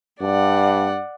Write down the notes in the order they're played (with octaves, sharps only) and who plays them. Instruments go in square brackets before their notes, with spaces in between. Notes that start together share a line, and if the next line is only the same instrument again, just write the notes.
[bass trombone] G2 [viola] D5 F#5